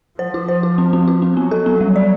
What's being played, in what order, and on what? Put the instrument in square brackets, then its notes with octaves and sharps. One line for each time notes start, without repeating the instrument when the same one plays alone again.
[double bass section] F3 [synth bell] C5
[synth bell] F4
C5
F4
C4
C4
F4
C4
[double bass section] F#3 [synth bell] B3
[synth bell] A4
B3
G3
D5